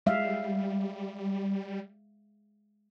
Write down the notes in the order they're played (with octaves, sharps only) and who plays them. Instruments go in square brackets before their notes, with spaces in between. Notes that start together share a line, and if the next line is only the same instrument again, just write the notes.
[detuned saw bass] G3 [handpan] G#3 E5 F5